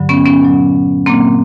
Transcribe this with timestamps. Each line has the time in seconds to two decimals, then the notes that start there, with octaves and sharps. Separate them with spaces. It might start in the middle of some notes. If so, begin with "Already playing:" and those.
Already playing: G2 D3 F#3
0.09 B3 C#4
0.26 B3 C#4
0.42 A#2 F#3
1.06 A#2 F#3 A#3 C4